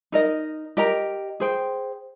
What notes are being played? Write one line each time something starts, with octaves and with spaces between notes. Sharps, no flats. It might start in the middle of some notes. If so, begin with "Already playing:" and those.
D#4 A#4 D#5
G4 A#4 D#5 A#5
G#4 C5 G5